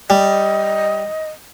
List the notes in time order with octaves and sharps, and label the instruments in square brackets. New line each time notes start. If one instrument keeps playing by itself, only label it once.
[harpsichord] G3 [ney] D#5